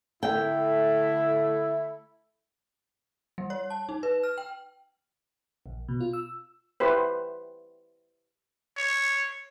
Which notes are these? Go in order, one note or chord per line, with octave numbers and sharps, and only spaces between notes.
D3 A3 E4 G5
G3
C#5
A5
D#4
B4
F6
G5
A#1
B2
F4
E6
E4 G4 B4 C5
C#5